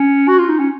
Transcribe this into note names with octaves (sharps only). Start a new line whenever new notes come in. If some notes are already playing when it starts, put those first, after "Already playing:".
Already playing: C#4
F#4
F4
D#4
C#4